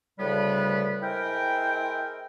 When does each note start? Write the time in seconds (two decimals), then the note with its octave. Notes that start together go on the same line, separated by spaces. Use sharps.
0.19 D2 A2 C#3 G3 B3 B4
1.03 G#3 E4 A#4 C5 G5